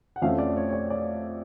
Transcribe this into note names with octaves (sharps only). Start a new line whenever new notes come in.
F#5
F2 F3 A3 C#4 F5
D5
C#5
C#5
D5
D5